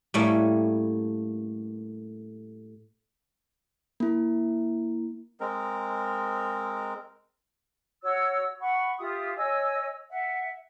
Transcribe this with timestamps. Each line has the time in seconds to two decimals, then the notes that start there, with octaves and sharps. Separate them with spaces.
0.14 A2 G3 A3 A#3 C#4
4.00 A#3 E4
5.40 G#3 C4 A#4
8.03 F#4 C#5 E6
8.60 F#5 B5 C#6
8.99 F4 G4 E5 D#6
9.36 C#5 D#5 G#5 E6
10.09 E5 F#5